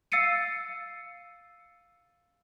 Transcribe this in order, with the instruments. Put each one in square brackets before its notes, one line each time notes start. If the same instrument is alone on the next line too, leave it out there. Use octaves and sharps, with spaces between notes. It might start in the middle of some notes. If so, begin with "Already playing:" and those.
[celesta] F5 E6 A6 C7 C#7 D#7